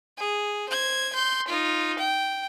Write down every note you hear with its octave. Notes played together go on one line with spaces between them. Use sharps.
G#4
C5 G#6
C6 G6
D#4 F4
G5